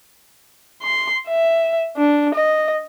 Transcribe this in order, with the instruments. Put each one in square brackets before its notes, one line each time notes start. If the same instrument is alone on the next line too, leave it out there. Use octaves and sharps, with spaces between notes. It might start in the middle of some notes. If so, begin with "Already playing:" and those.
[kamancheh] C6
E5
D4
D#5